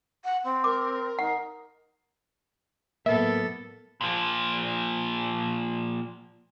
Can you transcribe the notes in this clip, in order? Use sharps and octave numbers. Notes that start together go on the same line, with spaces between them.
F#5
C4
A#4 D6
D#4 F#5
A2 F#3 A#3 B3 A4 E5
A#2 F3